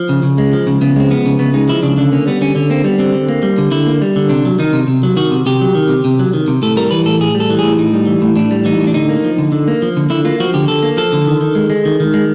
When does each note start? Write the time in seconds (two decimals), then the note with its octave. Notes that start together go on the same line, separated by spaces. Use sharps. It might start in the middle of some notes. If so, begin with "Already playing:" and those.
Already playing: F3
0.09 C#3
0.23 C#3
0.38 G#3
0.53 F3
0.67 C#3
0.81 C#3 B3
0.96 G#3 C4
1.10 F3 B3
1.26 C#3
1.39 C#3 B3
1.54 G#3 D#4
1.69 F3 E4
1.83 C#3 D4
1.98 D3 D4
2.12 A#3 C#4
2.27 G3 B3
2.41 D3 C#4
2.55 D3 C#4
2.70 A#3 C4
2.84 G3 B3
2.99 D3 C4
3.14 D3
3.29 A#3
3.43 G3
3.58 D3
3.71 D3 E4
3.87 A#3
4.02 G3
4.16 D3
4.29 C3 D4
4.45 F#3
4.59 D#3 D#4
4.73 C3
4.87 C3
5.03 F#3
5.17 D#3 F#4
5.31 C3
5.46 C3 G4
5.61 F#3
5.75 D#3
5.89 C3
6.05 C3
6.19 F#3
6.33 D#3
6.48 C3
6.62 A2 A4
6.77 G3 A#4
6.91 E3 B4
7.06 A2 A4
7.20 A2 G#4
7.35 G3
7.40 A4
7.50 E3
7.59 A2 G#4
7.79 A2 D#4
7.93 G3
8.07 E3
8.22 A2
8.36 A2 D4
8.51 G3
8.65 E3 D#4
8.80 A2
8.87 D4
8.94 D3 D#4
9.09 A#3
9.24 F3
9.38 D3
9.52 D3
9.68 A#3
9.82 F3
9.97 D3
10.10 D3 E4
10.25 A#3 F4
10.40 F3 F#4
10.54 D3 G4
10.68 D3 A4
10.83 A#3
10.97 F3 A4
11.13 D3
11.27 D#3
11.41 D#3
11.55 G#3
11.70 G#3
11.85 D#3
12.00 D#3
12.14 G#3